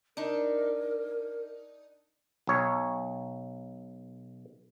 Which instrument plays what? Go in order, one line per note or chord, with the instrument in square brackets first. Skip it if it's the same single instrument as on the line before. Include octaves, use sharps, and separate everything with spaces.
[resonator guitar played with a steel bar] D4 D#4 [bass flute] A#4
[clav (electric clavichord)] B1 C#5